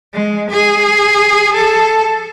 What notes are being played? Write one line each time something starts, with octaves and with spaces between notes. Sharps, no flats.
G#3
G#4
A4